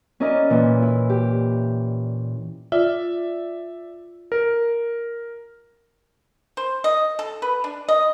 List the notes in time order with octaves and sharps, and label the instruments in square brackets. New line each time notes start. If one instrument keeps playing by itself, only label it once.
[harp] C#4 E4 A#4 D5 D#5
A#2 E3
E4
G4
[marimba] F4 [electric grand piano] D5 E5
[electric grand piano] A#4
[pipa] C5
D#5
A4
B4
D4
D#5